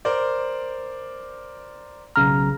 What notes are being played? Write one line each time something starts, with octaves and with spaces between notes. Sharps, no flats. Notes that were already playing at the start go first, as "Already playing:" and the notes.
A#4 C5 D5
B1 C#3 A#5 F6